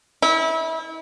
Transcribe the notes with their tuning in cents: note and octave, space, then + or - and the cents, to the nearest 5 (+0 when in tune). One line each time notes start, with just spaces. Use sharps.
E4 -30